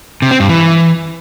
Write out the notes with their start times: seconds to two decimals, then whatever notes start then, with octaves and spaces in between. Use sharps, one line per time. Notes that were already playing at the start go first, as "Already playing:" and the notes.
0.22 C3
0.31 C4
0.40 G2
0.49 E3